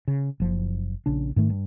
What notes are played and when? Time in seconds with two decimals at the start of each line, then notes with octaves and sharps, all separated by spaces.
0.08 C#3
0.40 F#1 F3
1.06 A#1 C#3 D4
1.36 G#2 D#3 A3
1.50 G2